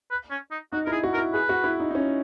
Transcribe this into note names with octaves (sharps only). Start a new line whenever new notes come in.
B4
C#4
D#4
D#4 F#4
E4 A#4
G#4
F#4
A#4
E4
G#4 B4
F#4
E4
D#4
D#4
C#4